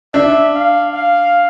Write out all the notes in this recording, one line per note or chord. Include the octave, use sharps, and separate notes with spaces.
D4 E5
F5
F5